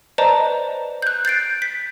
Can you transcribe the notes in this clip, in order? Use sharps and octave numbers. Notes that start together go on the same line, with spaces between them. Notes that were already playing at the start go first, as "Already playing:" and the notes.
B4 C5 D5 D#5 A5 A#5
F#6 G6
G6 A6 C7 D7
B6